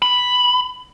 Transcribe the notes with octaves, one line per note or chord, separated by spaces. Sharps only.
B5